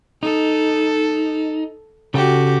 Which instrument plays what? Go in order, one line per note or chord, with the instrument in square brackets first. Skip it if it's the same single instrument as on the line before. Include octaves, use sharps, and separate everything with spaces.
[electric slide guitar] D#4 [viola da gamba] A4
[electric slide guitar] C#3 A4 G5 [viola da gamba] F#4 G4